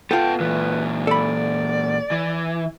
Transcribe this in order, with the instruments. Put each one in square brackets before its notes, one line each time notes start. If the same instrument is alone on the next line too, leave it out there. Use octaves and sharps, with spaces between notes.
[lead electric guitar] B3 A5 [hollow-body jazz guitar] F4 A4 [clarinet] G5
[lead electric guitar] A#2 E3 [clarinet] B4
[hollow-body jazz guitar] A4 B5 [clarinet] D5
[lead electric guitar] E3